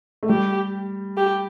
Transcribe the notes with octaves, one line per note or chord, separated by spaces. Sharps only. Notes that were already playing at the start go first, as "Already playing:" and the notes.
A3
G3 G4
G4